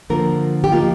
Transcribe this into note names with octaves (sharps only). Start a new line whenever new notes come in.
D3 F3 A#3 A#4
G4
F3 A#3 D#4 F4